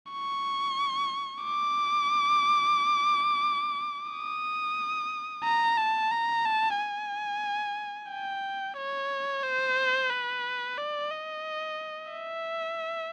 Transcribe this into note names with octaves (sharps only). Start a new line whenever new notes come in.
C#6
D6
D#6
A#5
A5
A#5
A5
G#5
G5
C#5
C5
B4
D5
D#5
E5